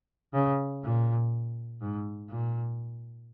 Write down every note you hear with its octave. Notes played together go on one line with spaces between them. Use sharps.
C#3
A#2
G#2
A#2